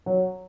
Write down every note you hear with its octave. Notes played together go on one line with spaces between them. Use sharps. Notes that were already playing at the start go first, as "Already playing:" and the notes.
F#3